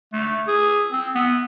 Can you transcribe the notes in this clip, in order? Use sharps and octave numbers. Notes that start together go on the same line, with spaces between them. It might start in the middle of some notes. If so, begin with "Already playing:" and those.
A3
G#4
C4
B3